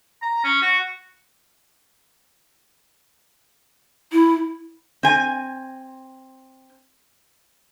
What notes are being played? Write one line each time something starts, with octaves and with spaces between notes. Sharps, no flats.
A#5
C#4
F#4
E4
C4 G#5